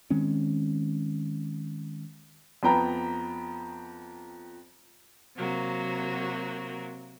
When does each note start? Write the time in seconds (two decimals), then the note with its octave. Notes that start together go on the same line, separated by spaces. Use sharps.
0.10 D#3 G#3 C4 C#4
2.63 F2 B3 G5 A#5 B5
5.37 C3 F#3 A#3 F#4